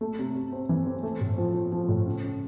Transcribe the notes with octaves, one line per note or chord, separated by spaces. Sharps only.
A3
C3
C3
C4
E3
C4
A3
A2
F3
F3
F3
A2
C#3
C#3